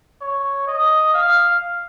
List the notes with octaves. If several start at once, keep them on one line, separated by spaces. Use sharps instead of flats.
C#5
D#5
F5